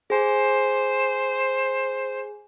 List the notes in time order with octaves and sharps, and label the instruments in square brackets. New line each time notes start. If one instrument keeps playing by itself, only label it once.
[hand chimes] G#4 G#5 [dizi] C5